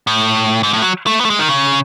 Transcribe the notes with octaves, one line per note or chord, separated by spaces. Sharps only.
A2
G#2
A2
F#3
A3
B3
A3
G#3
D#3
C#3